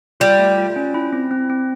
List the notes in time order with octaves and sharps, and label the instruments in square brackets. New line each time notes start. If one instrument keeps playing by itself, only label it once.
[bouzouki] G3 [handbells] F4
[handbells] A3
F4
C#4
E4
C4
C4
C4